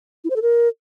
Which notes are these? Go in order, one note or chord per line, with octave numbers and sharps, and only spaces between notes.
E4
C5
A4
A#4